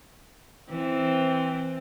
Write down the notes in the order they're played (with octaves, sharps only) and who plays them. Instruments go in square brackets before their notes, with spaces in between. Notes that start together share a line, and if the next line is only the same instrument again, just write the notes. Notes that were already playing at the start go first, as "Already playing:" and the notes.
[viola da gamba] E3 C4